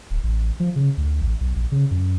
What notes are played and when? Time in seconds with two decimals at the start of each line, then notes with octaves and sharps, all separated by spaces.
0.11 D1
0.24 A1
0.60 F3
0.76 C#3
0.97 D2
1.22 A1
1.41 B1
1.56 A#1
1.72 C#3
1.91 F#2